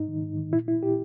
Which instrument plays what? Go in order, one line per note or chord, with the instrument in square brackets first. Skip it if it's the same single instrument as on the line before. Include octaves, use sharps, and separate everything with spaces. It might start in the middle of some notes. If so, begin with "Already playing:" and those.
Already playing: [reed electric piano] G#2 D#4
D#3
G#2
D#3
A#2 E4
E4
A#2 G4